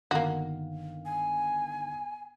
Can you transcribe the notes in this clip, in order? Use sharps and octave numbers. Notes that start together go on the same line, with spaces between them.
G1 D#3 A#3 F#4 F5
G#5